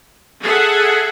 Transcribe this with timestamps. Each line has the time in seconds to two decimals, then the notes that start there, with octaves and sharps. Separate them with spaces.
0.42 G#4 A4 E5 F#5